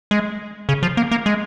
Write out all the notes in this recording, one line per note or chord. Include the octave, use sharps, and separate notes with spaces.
G#3
C#3
F3
A#3
A#3
G#3